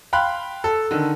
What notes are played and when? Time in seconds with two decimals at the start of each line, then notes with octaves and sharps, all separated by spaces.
0.13 F5 G5 B5 C6 F#6
0.64 A4
0.91 D3 D#3